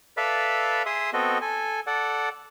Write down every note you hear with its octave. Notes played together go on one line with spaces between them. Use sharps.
A4 B4 D5 E5 F5 B5
G#4 E5 C6 D#6
B3 C4 F#4 A4 D#5
A4 G#5
A4 D5 F#5